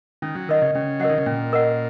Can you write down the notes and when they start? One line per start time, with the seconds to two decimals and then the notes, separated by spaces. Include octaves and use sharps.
0.22 D#3 C#4
0.35 F#3
0.49 D#3 A#4 D#5 F#5
0.62 C#3
0.75 C#3 C#4
1.00 F#3 A#4 D#5 F#5
1.09 D#3
1.18 C#3
1.26 A#2 C#4
1.53 A#4 D#5 F#5